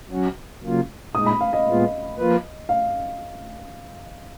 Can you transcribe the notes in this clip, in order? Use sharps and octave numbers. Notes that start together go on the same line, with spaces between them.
F#3 C#4 F#4
C#3 F#3 A#3 F4
A#2 G#3 D#4 D#6
B5
F5
D#5
A#2 G#3 B3 F4
F3 A#3 F4 B4
F5